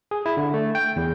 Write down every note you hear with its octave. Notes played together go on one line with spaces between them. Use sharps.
G#4
E4
D3
A3
G5
E2